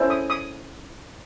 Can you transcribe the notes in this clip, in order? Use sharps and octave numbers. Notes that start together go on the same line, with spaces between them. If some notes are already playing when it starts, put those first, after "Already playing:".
Already playing: C#4 E4 A4 C5
D#6
D#6